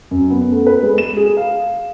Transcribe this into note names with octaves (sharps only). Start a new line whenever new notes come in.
F#2
B3
A3
B4
G#3
E7
G#4
F5